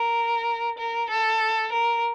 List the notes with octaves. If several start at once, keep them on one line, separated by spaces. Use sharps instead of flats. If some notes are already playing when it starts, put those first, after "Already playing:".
Already playing: A#4
A#4
A4
A#4